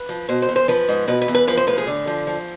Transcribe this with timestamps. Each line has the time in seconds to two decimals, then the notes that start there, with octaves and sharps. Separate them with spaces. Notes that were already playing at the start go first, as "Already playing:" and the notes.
Already playing: B4
0.09 F3
0.29 B2 C5
0.42 C5
0.49 E2
0.56 C5
0.68 F3 B4
0.88 G#2
1.08 B2 B4
1.22 B4
1.28 E2
1.35 B4
1.47 F3 B4
1.57 C5
1.67 A2 B4
1.78 G#4
1.87 D3
2.07 F3
2.27 F3